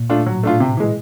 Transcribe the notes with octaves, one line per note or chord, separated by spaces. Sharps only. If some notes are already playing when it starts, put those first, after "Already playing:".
Already playing: A#2
A3 D4 F4
A2 F#3
A3 D4 F4
C3
E3 G#3